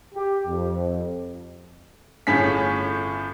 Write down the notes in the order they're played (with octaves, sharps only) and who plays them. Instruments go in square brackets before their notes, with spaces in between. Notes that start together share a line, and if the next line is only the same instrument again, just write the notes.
[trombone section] G4
F2
[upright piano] G1 A2 A3 C#4 G#4 B6